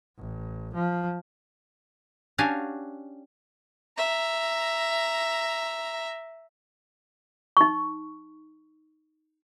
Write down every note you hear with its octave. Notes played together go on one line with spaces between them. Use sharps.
A1
F3
C#4 D4 F#4 G4 F5 G#5
E5 A#5
D#4 C#6